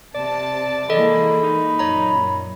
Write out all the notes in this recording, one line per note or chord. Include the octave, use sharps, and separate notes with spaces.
C3 D5 A5
E3 G#3 A#3 A4 D#5 B5
D#4
F#2 A#2 C#5 A#5